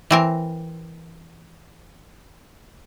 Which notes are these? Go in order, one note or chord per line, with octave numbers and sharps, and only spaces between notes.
E3 C4 A#4